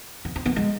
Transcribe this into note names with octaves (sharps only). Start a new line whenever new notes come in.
B3
C4
B3
G#3